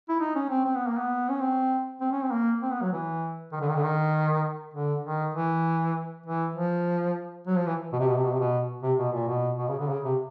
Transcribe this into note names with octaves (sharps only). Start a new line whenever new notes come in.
E4
D#4
C#4
C4
C4
B3
A#3
B3
C#4
C4
C4
C#4
C4
A#3
C4
B3
F#3
E3
D#3
D3
D#3
D3
D#3
D3
D#3
E3
E3
F3
F#3
F3
E3
B2
C3
B2
C3
B2
C3
B2
C3
B2
A#2
B2
B2
C#3
D3
C#3
C3